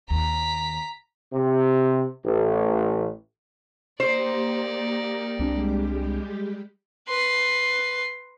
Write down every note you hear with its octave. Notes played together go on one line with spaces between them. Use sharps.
D#2 A#5 B6
C3
A1
A#3 D#4 G4 A#4 C5 D5
C2 G3 G#3 C4 D4 G4
B4 C6